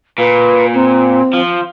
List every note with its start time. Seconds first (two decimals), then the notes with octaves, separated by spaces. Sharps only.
0.18 A#2 B4
0.74 C4
1.33 F3